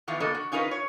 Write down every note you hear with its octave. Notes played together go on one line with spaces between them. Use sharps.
D#3 E3 B3 F4
C#3 A#3 D4 A4 D#5
F#4
C#4 D#4 F4 A#4 B4
C#5